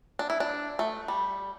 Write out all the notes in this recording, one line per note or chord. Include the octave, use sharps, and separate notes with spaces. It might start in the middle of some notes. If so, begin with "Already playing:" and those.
D4
E4
D4
A3
G3